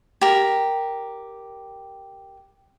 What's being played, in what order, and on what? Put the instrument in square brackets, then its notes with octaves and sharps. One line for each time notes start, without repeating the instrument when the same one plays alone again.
[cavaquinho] G4 A#4